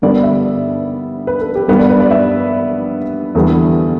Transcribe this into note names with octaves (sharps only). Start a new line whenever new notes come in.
G2 D3 G3 B3 D5
E5
B4
A4
G4
G2 G3 B3 B4
D5
B4
D5
E5
E2 D3 G3 B3 A4